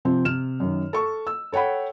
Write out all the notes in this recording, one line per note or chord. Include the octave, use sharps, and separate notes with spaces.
C3 F3 C4
C3 F6 E7
F#2 D#3
A4 C#6
E6
A4 C#5 F#5 G5 B5